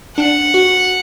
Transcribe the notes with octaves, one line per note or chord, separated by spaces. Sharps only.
D4 F#5
F#4